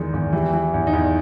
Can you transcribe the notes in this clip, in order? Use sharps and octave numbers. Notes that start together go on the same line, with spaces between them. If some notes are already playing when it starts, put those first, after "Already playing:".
Already playing: E2 D#3 G#3
E2
E3 G4
E3
E2
D#4
E2